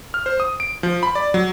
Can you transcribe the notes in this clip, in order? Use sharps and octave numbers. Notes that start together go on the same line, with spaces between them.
F6
C5
D#6
D7
F3
B5
D5
F#3